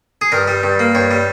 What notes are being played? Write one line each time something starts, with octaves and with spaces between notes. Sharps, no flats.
G#4
G2 A#4
G3
G2
A#3
G2 C#5
G3